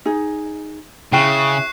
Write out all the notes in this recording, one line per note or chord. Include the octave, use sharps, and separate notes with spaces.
D#4 G#4
C#3 E4 G5 C#6 F#6 C7